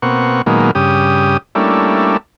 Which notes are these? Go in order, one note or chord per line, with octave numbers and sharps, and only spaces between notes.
B2 A#3 C4 F#5 C#6
A#2 D#3 F#3 G#3 A#3 B3
G2 C#3 G4 D#6
G3 A3 A#3 C#4 D4 E4